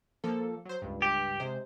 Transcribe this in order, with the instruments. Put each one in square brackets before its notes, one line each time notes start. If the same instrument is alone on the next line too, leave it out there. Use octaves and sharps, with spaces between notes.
[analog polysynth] F3 A#3 A4
F#3 C5
C#2 G2
[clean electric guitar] G4
[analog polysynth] C3 G#3 C5